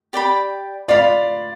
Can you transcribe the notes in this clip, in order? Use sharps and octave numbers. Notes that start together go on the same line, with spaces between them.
G4 D5 G5 B5
F4 B4 D5 F5 B5